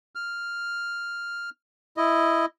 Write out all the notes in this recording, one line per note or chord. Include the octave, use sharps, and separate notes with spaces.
F6
E4 D#5